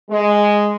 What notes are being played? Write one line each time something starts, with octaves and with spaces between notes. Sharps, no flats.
G#3